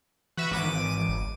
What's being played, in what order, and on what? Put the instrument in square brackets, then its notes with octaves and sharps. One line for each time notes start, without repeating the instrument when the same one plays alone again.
[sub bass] E3 [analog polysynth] F#4 B4 E5
[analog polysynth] G#1 D6 D#7
[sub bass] G1